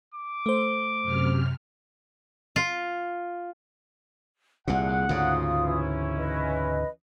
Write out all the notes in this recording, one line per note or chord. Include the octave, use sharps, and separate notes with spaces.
D6
A3 C5
F#2 C3 F6
F4
C2 A#2 G#4 F#5
D2 G#2 C#3 F4 F5 D#6
E3 C#4 E4
B4 D#5